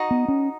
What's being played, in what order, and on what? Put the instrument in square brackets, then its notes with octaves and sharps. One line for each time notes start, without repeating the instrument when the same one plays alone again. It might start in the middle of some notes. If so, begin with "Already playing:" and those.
Already playing: [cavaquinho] D#4 F#4 D#5
[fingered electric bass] B3
C#4